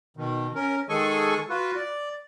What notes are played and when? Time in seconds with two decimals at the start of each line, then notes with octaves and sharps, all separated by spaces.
0.17 B2 D#3
0.55 C#4 A#4
0.89 D#3 G#3 G#4 A4 G#5 C#6
1.50 F4 F#4 B4
1.76 D5